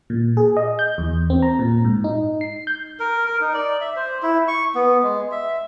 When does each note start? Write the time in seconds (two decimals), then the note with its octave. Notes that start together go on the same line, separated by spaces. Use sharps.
0.10 A#2
0.37 G#4
0.57 D#5
0.79 G6
0.98 E2
1.30 C4
1.42 A#5
1.59 A#2
1.85 G#2
2.04 D#4
2.41 C7
2.67 G6
3.00 A#4
3.26 A#4
3.41 D#4
3.54 D5
3.81 E5
3.96 C5
4.23 E4
4.48 C#6
4.75 B3
5.03 G#3
5.31 E5